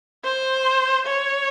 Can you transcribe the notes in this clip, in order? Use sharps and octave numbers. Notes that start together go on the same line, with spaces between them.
C5
C#5